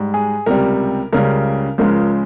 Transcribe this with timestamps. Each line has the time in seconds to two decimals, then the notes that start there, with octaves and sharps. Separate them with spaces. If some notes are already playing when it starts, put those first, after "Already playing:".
Already playing: G#2 G3
0.14 G#4
0.46 C#2 C3 G3 A#4
1.13 C#2 C#3 G3 A#4
1.78 C#2 C#3 F3 G#3 A#4